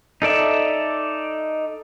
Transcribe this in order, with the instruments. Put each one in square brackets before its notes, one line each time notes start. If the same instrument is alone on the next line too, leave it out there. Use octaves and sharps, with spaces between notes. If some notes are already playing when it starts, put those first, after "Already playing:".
[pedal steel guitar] D#4 A4 D5 E5